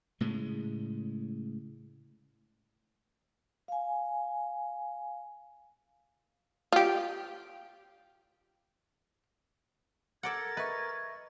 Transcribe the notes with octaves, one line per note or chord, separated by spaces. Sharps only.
A2 C#3 G#3
F5 G#5
F4 G4
A4 A#4 D5 F#5 G#6 A6
B4 D#5 E5 C#6